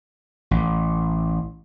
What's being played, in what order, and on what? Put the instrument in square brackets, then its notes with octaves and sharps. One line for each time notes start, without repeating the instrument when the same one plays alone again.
[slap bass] A1